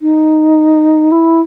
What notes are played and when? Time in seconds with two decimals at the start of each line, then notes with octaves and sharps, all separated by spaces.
0.02 D#4
1.12 E4